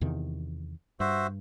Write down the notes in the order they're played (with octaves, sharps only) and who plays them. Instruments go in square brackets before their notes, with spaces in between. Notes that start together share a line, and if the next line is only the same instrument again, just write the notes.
[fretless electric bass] E2 C3 D#3
[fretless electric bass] G2 [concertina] F#4 C5 E5